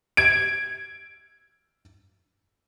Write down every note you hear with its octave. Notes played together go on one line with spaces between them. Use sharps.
G#6 D7